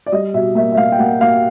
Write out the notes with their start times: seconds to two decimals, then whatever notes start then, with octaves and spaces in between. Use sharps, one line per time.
0.06 D5
0.12 G3 D#5
0.33 B2 E5
0.55 A#3 E5
0.72 E5
0.77 A#3 F5
0.92 G5
0.99 A#3 F#5
1.21 A#3 F5